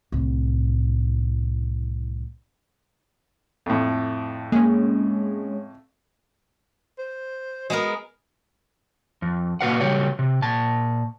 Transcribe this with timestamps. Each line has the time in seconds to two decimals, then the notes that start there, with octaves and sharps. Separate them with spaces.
0.12 C2 A2
3.66 F2 A2
4.52 G#3 A#3 C#4
6.98 C5
7.70 G#3 B3 F#4 A#4
9.22 F2
9.61 A#2 A#3 F#4 B4 F5 F#5
9.81 C#3 F#3 G3 G4 C#5
10.19 C3
10.42 A#2 A5